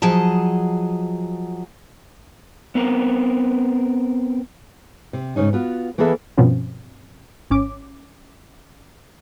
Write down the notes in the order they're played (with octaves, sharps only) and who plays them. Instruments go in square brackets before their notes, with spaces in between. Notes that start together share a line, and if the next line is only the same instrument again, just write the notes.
[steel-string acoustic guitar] F3 F#3 G#4 D#5 A5
[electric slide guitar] B3 C4 A#4
[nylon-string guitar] C3
G#2 C#3 C#4 D#4
B3 F4 F#4
E3 A#3 B3 G#4 A4 E5
[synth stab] G2 B2 F3 C4 C#4
G#1 C#4 D6